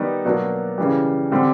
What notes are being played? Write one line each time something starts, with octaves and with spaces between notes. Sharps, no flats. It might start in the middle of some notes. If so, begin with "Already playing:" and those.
Already playing: D#3 G3 B3 D#4
B2 F#3 A#3 D4
C#3 E3 G3
D3 G3 C4